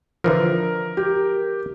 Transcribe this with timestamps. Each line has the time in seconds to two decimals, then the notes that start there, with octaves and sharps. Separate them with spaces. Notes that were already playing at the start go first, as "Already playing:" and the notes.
0.24 D3 E3 F3 A#4
0.97 G4